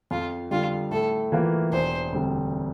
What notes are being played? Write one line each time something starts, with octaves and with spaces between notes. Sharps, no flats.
F2 F4
D3 G3 F4
A2 A4
E3 A#3 F4
E1 C5
D2 D3 G3 C4